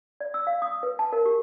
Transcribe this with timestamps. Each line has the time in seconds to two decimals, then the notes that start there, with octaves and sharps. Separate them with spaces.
0.20 D5
0.34 E6
0.47 F5
0.62 D#6
0.83 B4
0.99 A5
1.13 A#4
1.25 G4